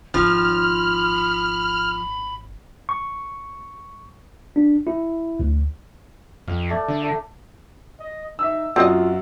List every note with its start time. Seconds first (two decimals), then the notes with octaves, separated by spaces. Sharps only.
0.14 G#1 F3 B5 F6
2.89 C#6
4.56 D4
4.87 E4
5.40 D2
6.48 F2 F5
6.69 A3 D5
6.88 D3
7.03 A3
8.00 D#5
8.39 D#4 E5 E6
8.76 F#2 C4 F4 F#4 D#5